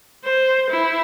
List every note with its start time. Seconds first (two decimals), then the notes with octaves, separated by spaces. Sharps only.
0.24 C5
0.70 E4